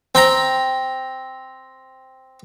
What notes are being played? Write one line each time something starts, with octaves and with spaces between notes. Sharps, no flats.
C4 G5 A#5